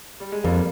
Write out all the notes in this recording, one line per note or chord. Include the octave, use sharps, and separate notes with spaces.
G3
G#3
F2 G3 A#3